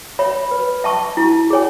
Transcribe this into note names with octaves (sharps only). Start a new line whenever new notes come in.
C#5 E5 B5
B4
E5 A5 C#6
E4
G#4 C#5 G#5